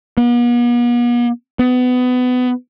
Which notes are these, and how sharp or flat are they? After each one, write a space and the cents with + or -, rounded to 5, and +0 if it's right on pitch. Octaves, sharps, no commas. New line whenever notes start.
B3 -45
B3 +25